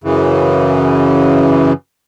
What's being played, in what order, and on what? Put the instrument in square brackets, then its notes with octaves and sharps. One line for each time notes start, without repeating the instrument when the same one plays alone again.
[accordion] F#2 C#3 E3